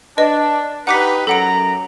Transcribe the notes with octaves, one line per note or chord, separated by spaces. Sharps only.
D4 B4 D#5
D#4 G4 B4 F#5 D6 B6
F#2 A4 F#5 A#5 D7